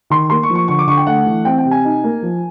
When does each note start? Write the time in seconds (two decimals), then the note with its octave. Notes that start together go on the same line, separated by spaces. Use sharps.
0.10 D#3 C6
0.30 A#3 C6
0.43 C#6
0.50 F3
0.55 C#6
0.68 D3 C#6
0.79 D6
0.87 D3 C#6
0.97 G5
1.07 A3 F#5
1.26 E3
1.45 C4 G5
1.58 G5
1.65 C3
1.71 G#5
1.85 D#4
2.04 A#3
2.22 F3